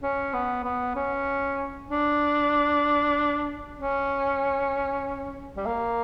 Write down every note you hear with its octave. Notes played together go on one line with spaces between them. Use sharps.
C#4
B3
B3
C#4
D4
C#4
G3
A#3